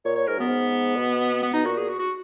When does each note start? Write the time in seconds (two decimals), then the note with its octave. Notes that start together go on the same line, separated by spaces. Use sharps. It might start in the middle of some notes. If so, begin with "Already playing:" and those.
0.05 A#2 C#5
0.16 C#5
0.27 G#2 A#4
0.37 F#2 B3
0.47 G#2
0.96 B2
1.43 B3
1.53 B2 D#4
1.65 A#2 F#4
1.77 G#4
1.88 F#4
1.99 F#4